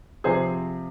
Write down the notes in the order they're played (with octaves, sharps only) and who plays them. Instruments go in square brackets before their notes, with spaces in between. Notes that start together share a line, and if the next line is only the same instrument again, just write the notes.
[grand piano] C3 F3 G#4 C5